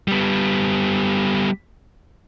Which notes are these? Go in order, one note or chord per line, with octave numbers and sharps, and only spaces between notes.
G3 B3